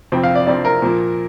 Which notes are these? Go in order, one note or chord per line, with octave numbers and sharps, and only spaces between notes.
F2 C3 F3 C4
F5
D5
F2 C3 F3 C4 D5
A#4
A#2 F3 A#3